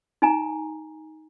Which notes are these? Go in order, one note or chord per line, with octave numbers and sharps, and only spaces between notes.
D#4 G#5 A#5